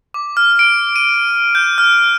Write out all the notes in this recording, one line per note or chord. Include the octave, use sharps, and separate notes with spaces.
D6
F6
D7
D#7
G6
F6